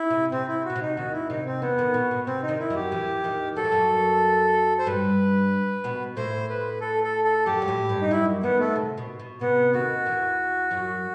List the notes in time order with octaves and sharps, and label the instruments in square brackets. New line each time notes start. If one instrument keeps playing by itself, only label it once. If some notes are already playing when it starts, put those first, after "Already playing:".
Already playing: [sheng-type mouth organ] E4
[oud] C3
[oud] C3 [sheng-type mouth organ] C4
[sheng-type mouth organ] E4
[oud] B2 [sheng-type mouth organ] F#4
[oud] C3
[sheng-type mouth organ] D#4
[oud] D#2 D#3 [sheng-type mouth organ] F#4
[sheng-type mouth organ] E4
[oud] C3 [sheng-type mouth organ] D#4
[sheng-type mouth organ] C4
[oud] E2 E3 [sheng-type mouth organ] B3
[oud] D#2 D#3
B2
B2
[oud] C3 [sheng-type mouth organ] C4
[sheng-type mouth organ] D#4
[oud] D#2 D#3
[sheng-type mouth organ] E4
[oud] F#2 F#3
[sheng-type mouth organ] G4
[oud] E2 E3
D#2 D#3
[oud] F#3 [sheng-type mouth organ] A4
[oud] E3
F#2 F#3
[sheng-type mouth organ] C5
[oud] G2 G3 [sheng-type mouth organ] B4
[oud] B2 B3
[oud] A2 A3 [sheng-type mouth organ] C5
[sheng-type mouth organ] B4
A4
A4
A4
[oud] F#2 F#3 [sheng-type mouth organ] G4
[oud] G3
A2 A3
G2 G3
[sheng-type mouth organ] D#4
[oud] F#2 F#3 [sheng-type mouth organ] E4
[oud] D#2 D#3 [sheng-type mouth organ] B3
[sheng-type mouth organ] A3
[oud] C3
B2
B2
[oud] C3 [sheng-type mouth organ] B3
[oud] D#2 D#3 [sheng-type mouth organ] F#4
[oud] E2 E3
F#2 F#3